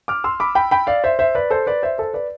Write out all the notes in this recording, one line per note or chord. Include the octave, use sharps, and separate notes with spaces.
D6 F6
C6 E6
B5 D6
G5 B5
G5 B5
D5 F5
C5 E5
C5 E5
B4 D5
A4 C5
B4 D5
C5 E5
A4 C5
B4 D5